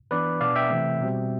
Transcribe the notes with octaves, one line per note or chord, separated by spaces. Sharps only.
E3 B3 D4 B4 D5
B2 B3 D4 D5 F5
E5 G5
C3 E3 A3 C4
B2 G3 C4